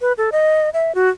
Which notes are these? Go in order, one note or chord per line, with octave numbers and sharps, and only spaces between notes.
B4
A4
D#5
E5
F#4